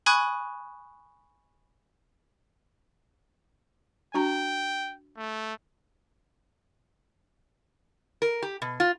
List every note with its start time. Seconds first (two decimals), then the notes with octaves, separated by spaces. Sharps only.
0.06 G#5 B5 C#6 D#6 F#6 G#6
4.14 D4 F#4 G5 A#5
5.17 A3
8.22 A#4
8.42 G4
8.62 B2
8.80 F4